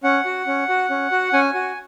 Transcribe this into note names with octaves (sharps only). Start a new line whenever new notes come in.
C#4 F#5
F#4
C#4
F#4
C#4
F#4
C#4 G#5
F#4